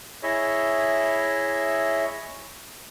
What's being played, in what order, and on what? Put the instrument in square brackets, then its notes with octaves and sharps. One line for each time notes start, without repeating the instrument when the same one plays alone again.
[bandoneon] E4 G#4 C#5 D#5 E5